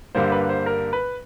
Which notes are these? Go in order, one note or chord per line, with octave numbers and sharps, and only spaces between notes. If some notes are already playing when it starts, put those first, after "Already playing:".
G2 D3 G3 A#3 C5
B4
C5
A#4
B4